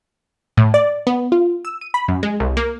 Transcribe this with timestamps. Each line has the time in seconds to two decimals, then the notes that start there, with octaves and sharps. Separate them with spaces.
0.57 A2
0.74 D5
1.07 B3
1.32 F4
1.65 E6
1.81 D#7
1.94 B5
2.08 F#2
2.23 G#3
2.40 C2
2.57 A#3